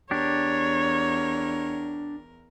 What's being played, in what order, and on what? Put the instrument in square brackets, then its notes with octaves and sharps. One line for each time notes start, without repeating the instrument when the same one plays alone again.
[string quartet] E2 A#4 [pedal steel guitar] D4 G4 [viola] C#5